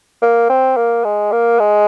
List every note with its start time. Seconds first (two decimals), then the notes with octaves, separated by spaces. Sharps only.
0.22 A#3
0.50 C4
0.77 A#3
1.04 G#3
1.32 A#3
1.60 G#3